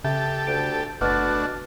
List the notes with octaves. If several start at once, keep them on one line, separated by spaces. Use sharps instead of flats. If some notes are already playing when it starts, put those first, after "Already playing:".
C#3 G4 A4 E5
D2 G6 D7
F#1 B2 A3 D4 F#4 F6 A6